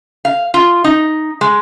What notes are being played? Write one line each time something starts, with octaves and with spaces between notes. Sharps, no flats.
F5
F4
D#4
G#3